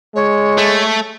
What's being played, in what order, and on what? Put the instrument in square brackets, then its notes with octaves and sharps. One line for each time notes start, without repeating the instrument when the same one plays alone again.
[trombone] G#3 [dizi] C#5
[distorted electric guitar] A3